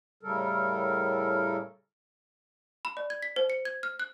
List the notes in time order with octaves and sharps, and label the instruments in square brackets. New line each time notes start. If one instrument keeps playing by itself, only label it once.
[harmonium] A2 C#3 G3 A4 A#4
[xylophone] B5
D5
G#6
B6
C5
C#7
G#6
F6
F#6